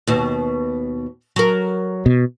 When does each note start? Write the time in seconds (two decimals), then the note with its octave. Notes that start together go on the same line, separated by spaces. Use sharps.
0.07 D#2 B2
1.36 F#3 A#4
2.06 B2